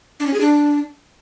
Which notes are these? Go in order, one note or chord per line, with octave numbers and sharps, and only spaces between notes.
D4
C#4
G#4
D4